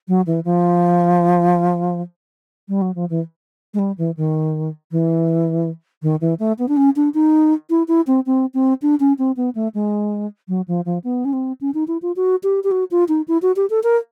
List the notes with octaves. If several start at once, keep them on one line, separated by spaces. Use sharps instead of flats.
F#3
E3
F3
G3
F#3
F3
E3
G#3
G3
E3
D#3
E3
D#3
E3
A3
B3
D4
C#4
D4
D#4
E4
E4
C4
C4
C4
D4
C#4
C4
B3
A3
G#3
F#3
F3
F3
B3
C#4
C4
C#4
D#4
E4
F4
F#4
G4
G4
F#4
F4
D#4
E4
F#4
G4
A4
A#4